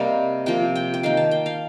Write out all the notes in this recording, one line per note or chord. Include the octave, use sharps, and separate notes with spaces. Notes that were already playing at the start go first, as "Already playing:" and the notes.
Already playing: C3 G3 A#3 D#5 F5
C3 F3 A#3 G5
G5
G5
D#3 A#3 F5
A5
G5
F5